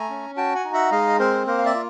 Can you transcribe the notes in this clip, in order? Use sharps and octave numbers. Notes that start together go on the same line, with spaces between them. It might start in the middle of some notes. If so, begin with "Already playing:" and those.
Already playing: A3 G#5 A#5
C#4
F#4 G5 A5
F#5 G#5
D#4
E5 F#5
G#3 D#5 F5
C4 A#4 C5
A#3 A#4 C5
F5
D5 E5
F4